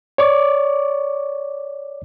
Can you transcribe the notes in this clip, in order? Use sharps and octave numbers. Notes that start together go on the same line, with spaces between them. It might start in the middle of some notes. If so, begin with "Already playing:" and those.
C#5 D5 C#6 D6